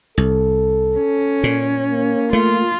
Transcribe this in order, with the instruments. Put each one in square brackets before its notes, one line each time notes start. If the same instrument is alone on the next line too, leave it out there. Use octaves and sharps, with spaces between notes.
[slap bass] C2 [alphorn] A4
[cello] C#4
[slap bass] A#2
[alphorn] A#3
[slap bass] A3 [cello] F4